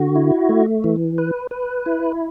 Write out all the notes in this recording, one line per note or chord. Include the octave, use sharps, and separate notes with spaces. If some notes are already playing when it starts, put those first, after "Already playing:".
Already playing: D3 F#4
E4
A3
E3
B4
B4
E4